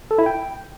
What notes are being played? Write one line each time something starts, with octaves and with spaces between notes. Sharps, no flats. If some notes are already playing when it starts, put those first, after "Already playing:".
A4
E4
G5